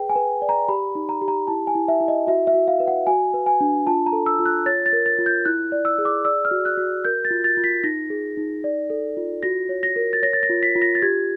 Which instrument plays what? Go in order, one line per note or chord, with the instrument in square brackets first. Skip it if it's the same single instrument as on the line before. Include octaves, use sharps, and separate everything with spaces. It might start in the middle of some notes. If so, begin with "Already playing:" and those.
Already playing: [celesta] G#4 B4 G5
G#5
B4
D5
A#5
G4 B5
D#4
A#5
G4
A#5
E4 A5
G#5
E4
E5
E4
D#5
F#4 E5
E5
F#4
F5
B4
F#5
F#4 G#5
B4
G#5
D4
F4 A5
A#5
A4
E6
F4
F#6
C#5 A6
A6
A#4
A6
F4
G6
E4 F#6
D5
E6
G#4
D6
D5 E6
F6
F#4
F#6
F#4
A#4 G6
A6
F4
A6
F4
B6
D#4 A#6
G#4
D#4
D5
A4
F4
F#4 A#6
C#5
A#6
A#4
A6
C#5 A#6
A6
A#6
F4
B6
F4
A#6
A6
G4 G#6